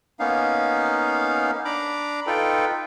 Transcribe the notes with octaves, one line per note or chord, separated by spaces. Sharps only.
A#3 B3 C#4 D#4 F5
D4 A#5 B5 D6
D#4 F4 A4 B4 G5